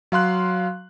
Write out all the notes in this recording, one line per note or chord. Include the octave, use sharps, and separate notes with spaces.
F#3 F5 C6 F#6